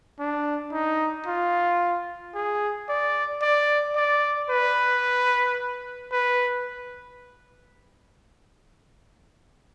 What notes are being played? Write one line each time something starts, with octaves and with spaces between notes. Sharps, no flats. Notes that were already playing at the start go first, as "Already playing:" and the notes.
D4
D#4
F4
G#4
D5
D5
D5
B4
B4